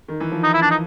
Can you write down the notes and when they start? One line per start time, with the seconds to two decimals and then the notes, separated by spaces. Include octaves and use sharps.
0.08 D#3
0.20 E3
0.32 F3
0.43 D#4
0.53 E4
0.62 D4
0.71 D#4